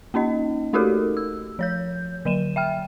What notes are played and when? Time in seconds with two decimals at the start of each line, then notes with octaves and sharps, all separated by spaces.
0.14 A#3 C#4 D#4 D#5
0.73 A3 D#4 F#4 G4 A4 A#4
1.17 E6
1.59 F3 C#5 G6
2.25 D3 F#3 D#7 E7
2.56 E5 G5 F6